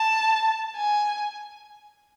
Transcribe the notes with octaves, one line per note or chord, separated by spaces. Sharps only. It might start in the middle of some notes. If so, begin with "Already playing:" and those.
Already playing: A5
G#5